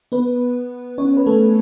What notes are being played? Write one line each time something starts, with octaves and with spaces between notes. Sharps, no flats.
B3 B4
C#4 C#5
B4
A3 A4